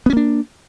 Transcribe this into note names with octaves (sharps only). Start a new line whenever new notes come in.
A#3 B3 C#4 D4